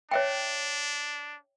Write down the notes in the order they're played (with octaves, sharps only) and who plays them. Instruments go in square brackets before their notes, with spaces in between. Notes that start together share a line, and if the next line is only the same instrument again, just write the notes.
[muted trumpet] D4 [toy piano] C#5 E5 G5